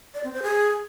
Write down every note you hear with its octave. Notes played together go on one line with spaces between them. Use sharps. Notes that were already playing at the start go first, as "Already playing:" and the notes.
D5
C4
C5
G#4